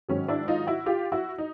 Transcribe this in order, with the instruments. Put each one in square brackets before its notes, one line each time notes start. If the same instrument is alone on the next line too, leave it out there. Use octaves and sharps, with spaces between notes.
[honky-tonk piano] G#2 D#3 F#3 C#4
D4 E4
D#4 F4
E4 F#4
F4 G4
E4 F#4
D#4